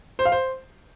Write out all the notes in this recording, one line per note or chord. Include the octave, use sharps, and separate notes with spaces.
C5
F5
C5